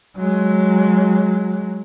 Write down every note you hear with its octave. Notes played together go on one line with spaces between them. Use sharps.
F#3 G#3